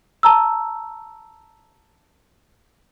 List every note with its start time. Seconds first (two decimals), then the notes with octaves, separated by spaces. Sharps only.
0.23 A5 A#5 E6